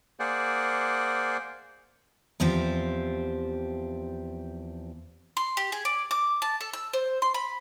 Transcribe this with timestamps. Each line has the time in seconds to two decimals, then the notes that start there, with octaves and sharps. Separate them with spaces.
0.20 A#3 G#4 C5 D5 F#5
2.40 E2 F3 C4 G4 C5
5.37 C6
5.57 G4
5.72 G#4
5.85 D5
6.11 D6
6.42 A5
6.61 A4
6.73 E6
6.93 C5
7.22 C6
7.34 B5